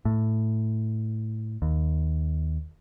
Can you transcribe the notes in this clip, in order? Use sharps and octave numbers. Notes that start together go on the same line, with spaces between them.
A2
D#2